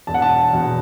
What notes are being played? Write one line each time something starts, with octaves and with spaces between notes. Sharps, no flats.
E1 A5
F#5
A5
E2 B2